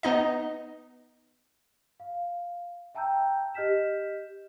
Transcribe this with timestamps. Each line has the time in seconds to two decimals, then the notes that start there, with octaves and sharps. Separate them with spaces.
0.03 B3 D#4 D#5
2.00 F5
2.95 E5 G5 A5 A#5 E6 G6
3.54 G4 D#5 F6 G6 B6 E7